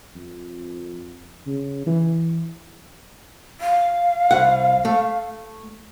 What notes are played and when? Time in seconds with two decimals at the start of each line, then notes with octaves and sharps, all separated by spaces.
0.16 F2
1.47 C#3
1.87 E3
3.61 F5
4.31 C2 F#5
4.85 A3